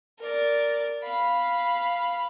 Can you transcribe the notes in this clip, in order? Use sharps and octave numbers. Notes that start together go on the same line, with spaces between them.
A#4 D5
F5 B5